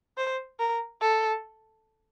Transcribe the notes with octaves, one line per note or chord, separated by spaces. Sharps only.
C5
A#4
A4